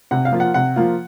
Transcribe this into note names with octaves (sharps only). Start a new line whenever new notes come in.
C3 F#5
F5
F3 A#3 F4
F#5
C3 F#5
F3 A#3 F4